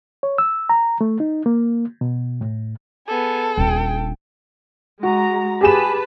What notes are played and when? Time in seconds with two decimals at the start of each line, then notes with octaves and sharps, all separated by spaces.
0.23 C#5
0.38 E6
0.69 A#5
1.01 A3
1.20 D#4
1.46 A#3
2.01 B2
2.41 A2
3.08 B3 G#4 A4
3.58 D#1 D4 G5
5.03 G#3 F#4 A#5
5.61 G4 G#4 B4 A5 B5 E7